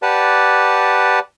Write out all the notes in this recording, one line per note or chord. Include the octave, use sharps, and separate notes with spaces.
G4 B4 D5 F#5 A5